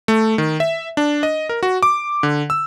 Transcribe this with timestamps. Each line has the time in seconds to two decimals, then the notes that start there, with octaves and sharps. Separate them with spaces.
0.08 A3
0.38 D#3
0.60 E5
0.97 D4
1.23 D#5
1.49 A#4
1.63 F#4
1.83 D6
2.23 D3
2.50 E6